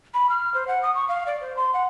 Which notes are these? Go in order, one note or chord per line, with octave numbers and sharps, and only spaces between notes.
B5
F6
C5
F#5
D#6
C#6
F5
D5
C5
C6
F#5